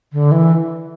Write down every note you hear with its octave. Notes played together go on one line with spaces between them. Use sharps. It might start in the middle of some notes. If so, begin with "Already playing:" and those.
D3
E3